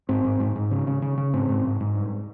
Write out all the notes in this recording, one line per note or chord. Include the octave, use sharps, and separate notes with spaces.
G#2 C4
G#2
G#2
G#2
C#3
C#3
C#3
C#3
G#2 C4
G#2
G#2
G#2
G2